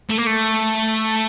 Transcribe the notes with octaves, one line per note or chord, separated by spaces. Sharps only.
A3
A#3
A3